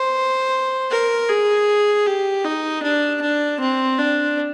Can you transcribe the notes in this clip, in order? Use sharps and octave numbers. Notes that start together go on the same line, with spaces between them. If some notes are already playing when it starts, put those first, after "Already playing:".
Already playing: C5
A#4
G#4
G4
D#4
D4
D4
C4
D4